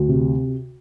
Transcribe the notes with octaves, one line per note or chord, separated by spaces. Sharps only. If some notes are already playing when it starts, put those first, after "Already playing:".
Already playing: D2
C3